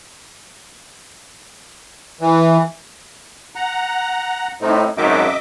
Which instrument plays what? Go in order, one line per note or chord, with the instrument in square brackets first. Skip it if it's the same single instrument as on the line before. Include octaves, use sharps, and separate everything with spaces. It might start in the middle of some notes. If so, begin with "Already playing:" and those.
[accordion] E3
F#5 A#5
[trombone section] A2 [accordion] C4 D#4
[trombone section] G#1 F#2 D#3 [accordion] D#5 E5 D6